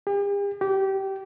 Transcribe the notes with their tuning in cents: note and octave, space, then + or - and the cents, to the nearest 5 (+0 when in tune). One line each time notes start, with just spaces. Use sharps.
G4 +45
G4 -20